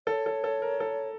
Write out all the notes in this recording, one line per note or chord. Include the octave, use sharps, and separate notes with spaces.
A4 C#5
A4
A4
A#4
A4